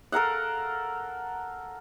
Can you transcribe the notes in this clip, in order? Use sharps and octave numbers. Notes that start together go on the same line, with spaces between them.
A4 A#4 F5 F#5